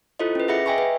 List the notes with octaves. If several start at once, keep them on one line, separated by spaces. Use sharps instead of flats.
E4 F4 A4 C5 D#5
C#4 B4
G#4 E5 F#5 B5 A#6 C#7
D#5 E5 G5 G#5 B5 C#6
B4